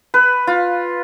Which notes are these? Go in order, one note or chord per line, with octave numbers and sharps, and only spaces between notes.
B4
F4